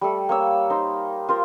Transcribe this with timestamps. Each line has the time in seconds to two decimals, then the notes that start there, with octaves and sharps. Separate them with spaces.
0.01 G3 A3 A4
0.29 A#3 C#5 E6
0.70 D#4 C5
1.29 F4 A#4 C5